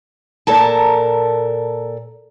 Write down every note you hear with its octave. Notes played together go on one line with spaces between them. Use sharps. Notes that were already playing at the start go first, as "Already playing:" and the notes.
A#2 A4 A#4 A5